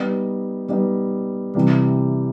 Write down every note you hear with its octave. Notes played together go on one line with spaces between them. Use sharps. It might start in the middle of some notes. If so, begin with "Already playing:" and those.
Already playing: G3 B3 D#4
G3 B3 D#4
C3 E3 G3